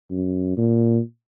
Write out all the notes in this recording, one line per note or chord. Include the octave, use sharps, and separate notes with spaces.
F#2
A#2